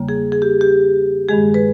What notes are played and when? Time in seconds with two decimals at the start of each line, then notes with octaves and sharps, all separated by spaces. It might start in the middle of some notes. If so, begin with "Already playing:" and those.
Already playing: E2 C#3 G3 A#3
0.09 G#4
0.32 G#4
0.42 G4
0.61 G4
1.29 G2 D#3 G#3 G#4
1.54 B4